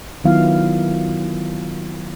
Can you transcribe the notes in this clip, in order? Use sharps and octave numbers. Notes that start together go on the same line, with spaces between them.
D#3 F#3 B3 E4 F4 F5